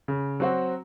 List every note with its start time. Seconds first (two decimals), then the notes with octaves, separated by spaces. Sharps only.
0.08 C#3
0.40 F#3 C4 F#4